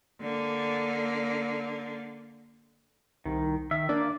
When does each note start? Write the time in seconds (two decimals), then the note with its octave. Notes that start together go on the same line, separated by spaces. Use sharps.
0.21 D3 A#3
3.25 C2 D#3
3.71 D#3 E5
3.89 A#3 D4 D5